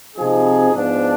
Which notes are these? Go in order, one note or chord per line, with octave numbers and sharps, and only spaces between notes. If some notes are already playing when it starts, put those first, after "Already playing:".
C3 F3 C4 D#4 G#4
G#2 F3 B3 D4